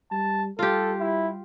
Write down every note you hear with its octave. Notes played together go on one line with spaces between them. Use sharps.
G3 A5
G3 F4 G4 A4
E4